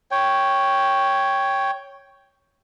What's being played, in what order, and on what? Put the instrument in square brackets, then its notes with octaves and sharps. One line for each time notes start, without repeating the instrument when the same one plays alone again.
[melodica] C#5 G5